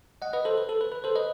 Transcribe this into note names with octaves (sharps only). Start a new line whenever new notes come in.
D#5 F#5
B4 D#5
A4 C5
B4
A4
B4
B4
A4 C5
B4 D#5